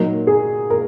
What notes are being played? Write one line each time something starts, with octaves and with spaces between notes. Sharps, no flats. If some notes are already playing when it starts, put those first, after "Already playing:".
Already playing: A#2 F#3 A#3 D#4 A#4
G#4
A#4